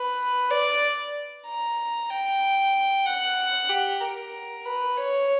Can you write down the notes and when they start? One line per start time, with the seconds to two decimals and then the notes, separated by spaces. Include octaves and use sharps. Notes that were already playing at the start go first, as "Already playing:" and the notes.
Already playing: B4
0.51 D5
1.47 A#5
2.10 G5
3.06 F#5
3.69 G4
4.01 A#4
4.65 B4
4.97 C#5